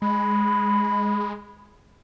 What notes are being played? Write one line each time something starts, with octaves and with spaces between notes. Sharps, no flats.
G#3 B5